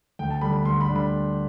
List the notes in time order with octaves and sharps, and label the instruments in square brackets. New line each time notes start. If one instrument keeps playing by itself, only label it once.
[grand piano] D2 G5
A5
D3 G3 D4 B5
B5
D2 C6
B5
D3 G3 D4
B5